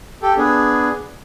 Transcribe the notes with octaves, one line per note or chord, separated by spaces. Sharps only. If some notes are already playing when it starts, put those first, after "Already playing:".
G4 A4 G5
B3 D4 G#4